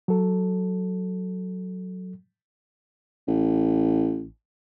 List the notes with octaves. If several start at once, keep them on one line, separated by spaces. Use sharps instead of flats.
F#3 A4
A1